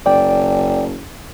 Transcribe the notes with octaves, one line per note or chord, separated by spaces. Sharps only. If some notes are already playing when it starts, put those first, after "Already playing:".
F#1 D5 G5